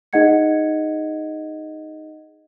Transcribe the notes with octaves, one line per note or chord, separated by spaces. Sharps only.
D#4 G#4 D#5 F#5 G#6 C#7